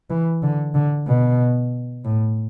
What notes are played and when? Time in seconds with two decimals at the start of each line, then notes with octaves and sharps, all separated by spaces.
0.10 E3
0.43 D3
0.74 D3
1.07 B2
2.05 A2